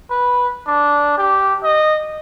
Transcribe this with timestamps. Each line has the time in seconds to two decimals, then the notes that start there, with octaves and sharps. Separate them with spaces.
0.10 B4
0.67 D4
1.17 G4
1.64 D#5